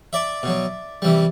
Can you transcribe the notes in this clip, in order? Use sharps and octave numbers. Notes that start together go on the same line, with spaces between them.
D5 E5
B2 F#3
C3 E3 G3